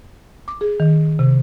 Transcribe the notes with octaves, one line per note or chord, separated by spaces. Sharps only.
D6
G#4
D#3
C3